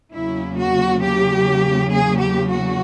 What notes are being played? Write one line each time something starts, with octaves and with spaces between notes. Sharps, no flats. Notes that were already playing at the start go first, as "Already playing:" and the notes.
E2 C#3 F#3 A#3 E4
F#4
G4
G#4
G4
F#4